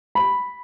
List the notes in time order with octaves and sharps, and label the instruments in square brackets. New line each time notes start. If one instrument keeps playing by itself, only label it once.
[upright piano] B5